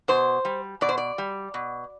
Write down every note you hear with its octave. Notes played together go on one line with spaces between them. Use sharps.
B2 C5
G3
B2 D5
C5
D5
G3
B2